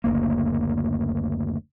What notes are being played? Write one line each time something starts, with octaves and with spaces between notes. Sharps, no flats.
F#1 D2 A#3